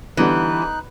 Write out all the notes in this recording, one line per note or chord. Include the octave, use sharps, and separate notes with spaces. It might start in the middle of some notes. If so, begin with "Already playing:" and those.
D3 E3 G3 B3 D#4 F#6